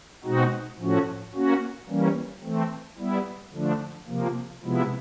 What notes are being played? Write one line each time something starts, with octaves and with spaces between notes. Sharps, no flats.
B2 G#3 C4 D#4 F#4
A2 F3 A3 C#4 F#4
A#3 C#4 F#4
E3 G3 A#3 C#4
E3 A3 C4
G3 B3 E4
D3 F3 A3 D4
C3 F3 A#3
C3 F3 G#3 B3 E4